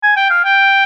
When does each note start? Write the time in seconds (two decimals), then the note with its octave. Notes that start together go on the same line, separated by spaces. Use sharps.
0.03 G#5
0.16 G5
0.30 F5
0.44 G5